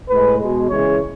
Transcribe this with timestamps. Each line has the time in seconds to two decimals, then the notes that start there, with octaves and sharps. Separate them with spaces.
0.09 A2 G#3 B4
0.40 B2 G#3
0.69 C#3 E3 G#3 C#5